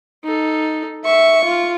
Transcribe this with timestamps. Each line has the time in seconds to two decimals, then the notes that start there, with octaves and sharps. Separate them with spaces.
0.24 D#4 A4
1.05 E5 C#6
1.45 F4